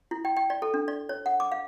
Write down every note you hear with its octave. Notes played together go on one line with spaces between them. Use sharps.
E4
G5
G5
D5
A4
D4
D5
C#5
F#5
D6
F5